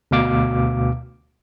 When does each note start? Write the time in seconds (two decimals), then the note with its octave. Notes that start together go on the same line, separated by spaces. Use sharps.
0.11 D2 B2 F5 D6